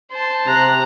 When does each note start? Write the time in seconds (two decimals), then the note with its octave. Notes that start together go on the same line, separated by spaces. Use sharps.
0.12 C5 A5
0.47 C3 A#5 F#6